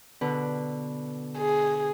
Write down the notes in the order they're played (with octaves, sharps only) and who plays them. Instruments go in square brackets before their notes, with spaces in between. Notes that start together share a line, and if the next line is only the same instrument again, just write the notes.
[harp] B2 D3 B4
[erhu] G#4